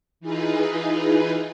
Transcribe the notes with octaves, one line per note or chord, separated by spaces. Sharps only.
E3 D#4 F4 G#4 B4